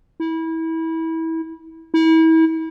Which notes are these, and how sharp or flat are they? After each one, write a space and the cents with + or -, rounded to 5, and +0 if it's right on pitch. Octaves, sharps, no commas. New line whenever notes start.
E4 -25
E4 -35